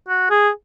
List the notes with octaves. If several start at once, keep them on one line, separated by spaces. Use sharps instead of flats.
F#4
G#4